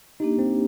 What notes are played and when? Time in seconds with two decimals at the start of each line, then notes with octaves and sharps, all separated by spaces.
0.20 A#3 D4 D#4 G4
0.39 C4